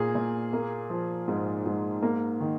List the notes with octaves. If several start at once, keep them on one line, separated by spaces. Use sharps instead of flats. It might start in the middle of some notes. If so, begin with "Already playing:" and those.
Already playing: A#2 A#3 G#4
A#2
A#3
F3
G#2
G#2
A#3
D#3